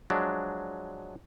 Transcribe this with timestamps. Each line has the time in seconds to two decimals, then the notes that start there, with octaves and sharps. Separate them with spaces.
0.10 F3 F#3 G#3 D4